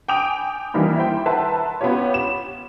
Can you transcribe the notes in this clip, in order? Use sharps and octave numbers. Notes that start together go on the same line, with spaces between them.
G5 G#5 D6 D#6 D7 F7
D#3 E3 G3 A#3 D#4
E4 C5 G5
B4 E5 F#5 A5 A#5 C6
B3 C#4 F4 G4 C#5
E7